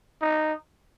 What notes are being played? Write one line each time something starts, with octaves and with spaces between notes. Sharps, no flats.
D#4